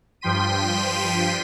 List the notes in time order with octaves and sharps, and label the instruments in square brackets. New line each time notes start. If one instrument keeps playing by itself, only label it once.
[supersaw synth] G2 F3 G5 C6 B6 D#7